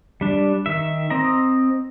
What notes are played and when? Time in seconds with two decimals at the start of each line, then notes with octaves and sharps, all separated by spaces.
0.21 G3 D4
0.66 D#3 E5
1.10 C4 D#5 A#5